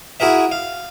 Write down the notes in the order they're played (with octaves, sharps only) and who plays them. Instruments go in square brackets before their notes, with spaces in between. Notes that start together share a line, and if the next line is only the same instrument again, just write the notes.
[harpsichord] E4 F#4 G#4 A#4 E5
F5